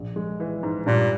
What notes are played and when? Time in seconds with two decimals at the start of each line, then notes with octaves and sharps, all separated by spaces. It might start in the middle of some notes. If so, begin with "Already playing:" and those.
Already playing: A#1
0.16 G#3
0.40 E3
0.63 G#2
0.86 G2 A#2